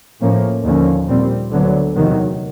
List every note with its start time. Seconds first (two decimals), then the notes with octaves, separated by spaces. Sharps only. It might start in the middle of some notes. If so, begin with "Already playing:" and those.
0.21 A2 F3 A#3 C#4
0.64 D#2 D3 F3 A#3 C#4
1.08 A#2 G3 C4
1.50 D2 D3 F#3 B3
1.94 E2 C3 D#3 F#3